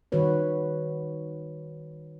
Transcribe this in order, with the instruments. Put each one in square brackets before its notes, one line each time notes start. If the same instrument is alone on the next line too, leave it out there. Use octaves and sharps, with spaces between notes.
[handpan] D#3 G3 F#4 B4 C#5